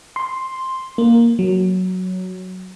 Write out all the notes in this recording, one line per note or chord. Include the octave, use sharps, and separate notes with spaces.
C6
A#3
F#3